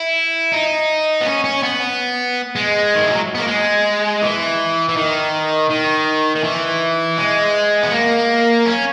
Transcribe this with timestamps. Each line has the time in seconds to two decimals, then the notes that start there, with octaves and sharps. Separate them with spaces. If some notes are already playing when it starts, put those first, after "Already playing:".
Already playing: E4
0.52 D#4
1.21 B3
1.26 C#4
1.44 C#4
1.63 B3
2.56 G#3
2.95 D#3
3.03 E3
3.11 F#3
3.35 B3
3.38 A#3
3.47 G#3
4.22 E3
4.89 E3
4.96 D#3
5.70 D#3
6.35 D#3
6.44 E3
7.17 G#3
7.83 B3
7.91 A#3
8.66 C#4